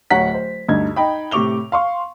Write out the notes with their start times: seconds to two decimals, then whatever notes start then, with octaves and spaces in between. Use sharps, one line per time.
0.11 D1 C#5 F#5 A#5 B6
0.34 C5
0.68 D2 G2 D#4 G#6
0.96 D#4 G5 B5
1.31 A2 C3 C#6 D6 F7 G7
1.72 F5 C6 C#6